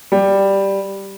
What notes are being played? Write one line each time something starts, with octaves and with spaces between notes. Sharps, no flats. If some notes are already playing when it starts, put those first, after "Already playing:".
G3